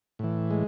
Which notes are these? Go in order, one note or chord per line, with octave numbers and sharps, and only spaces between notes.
A2 E3
G#3